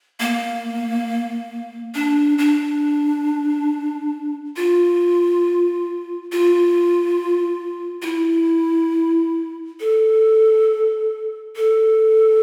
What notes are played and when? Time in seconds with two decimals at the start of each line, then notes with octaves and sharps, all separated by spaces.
0.20 A#3
1.95 D4
2.38 D4
4.56 F4
6.32 F4
8.02 F4
8.06 E4
9.80 A4
11.56 A4